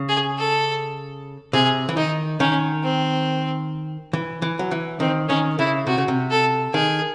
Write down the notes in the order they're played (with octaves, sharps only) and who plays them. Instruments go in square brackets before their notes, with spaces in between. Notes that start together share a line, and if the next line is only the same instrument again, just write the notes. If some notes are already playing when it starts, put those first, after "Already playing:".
Already playing: [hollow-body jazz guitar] C#3
[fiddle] G#4
A4
[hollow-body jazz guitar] C3 [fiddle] G#4
[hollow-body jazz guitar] E3
[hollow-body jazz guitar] D#3 [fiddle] D#4
[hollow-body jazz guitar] D#3 [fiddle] C#4
[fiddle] C4
[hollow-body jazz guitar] E3
E3
F#3
E3
[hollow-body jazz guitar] D#3 [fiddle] C4
[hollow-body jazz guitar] D#3 [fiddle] C#4
[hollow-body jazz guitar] C#3 [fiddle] E4
[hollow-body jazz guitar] C3 [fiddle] F#4
[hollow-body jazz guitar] C#3
C3
[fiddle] A4
[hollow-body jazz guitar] D#3 [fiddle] G#4